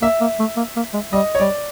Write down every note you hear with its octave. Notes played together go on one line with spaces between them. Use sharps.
A#3 E5
A#3
A3
A#3
A#3
G#3
G3 D#5
C#5
G3 D5